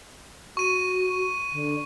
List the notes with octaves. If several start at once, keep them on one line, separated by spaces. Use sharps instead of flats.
F#4 C#6 D#7
D3